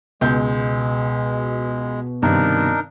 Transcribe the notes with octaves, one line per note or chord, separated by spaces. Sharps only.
C#2 B2 G#3 B3 G6
G2 C3 D#3 D4 D#4 A#4